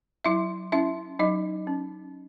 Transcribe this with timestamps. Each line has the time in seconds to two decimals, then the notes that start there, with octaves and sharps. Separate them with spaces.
0.25 F#3 E4 E5
0.72 C#4 E4 E5
1.19 F#3 D#4 D#5
1.67 C#4